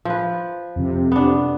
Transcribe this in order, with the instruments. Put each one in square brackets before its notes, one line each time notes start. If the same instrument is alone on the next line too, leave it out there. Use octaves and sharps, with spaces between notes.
[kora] F3 B4
[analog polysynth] F2 C3
[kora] B3 D4